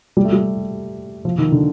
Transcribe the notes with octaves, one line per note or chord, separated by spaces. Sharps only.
G3
A3
G3
F3
D#3
D3